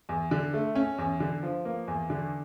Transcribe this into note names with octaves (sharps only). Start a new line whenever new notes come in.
E2
D3
A3
C#4
E2
D3
F3
A#3
E2
D3